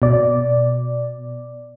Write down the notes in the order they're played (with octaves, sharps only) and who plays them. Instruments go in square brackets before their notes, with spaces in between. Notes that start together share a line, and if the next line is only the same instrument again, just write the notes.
[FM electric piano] B2 D5